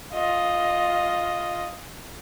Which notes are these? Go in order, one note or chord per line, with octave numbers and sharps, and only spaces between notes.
F4 D#5